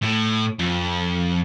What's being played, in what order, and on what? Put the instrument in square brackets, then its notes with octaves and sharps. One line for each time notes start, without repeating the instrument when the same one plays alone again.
[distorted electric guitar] A2
F2